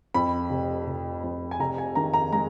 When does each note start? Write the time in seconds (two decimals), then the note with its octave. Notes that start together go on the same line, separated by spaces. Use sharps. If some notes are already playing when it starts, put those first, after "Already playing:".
0.14 F2 B5
0.50 F1
0.87 F1
1.24 F2
1.51 G#5
1.59 F1 A#5
1.78 G#5
1.95 D#3 A#5
2.14 A#5
2.32 G#3 A#5